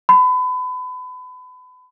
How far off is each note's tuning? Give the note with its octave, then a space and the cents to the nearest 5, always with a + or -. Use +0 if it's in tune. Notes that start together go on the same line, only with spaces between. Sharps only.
B5 +30